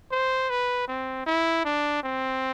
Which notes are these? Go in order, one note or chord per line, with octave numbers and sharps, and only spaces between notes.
C5
B4
C4
E4
D4
C4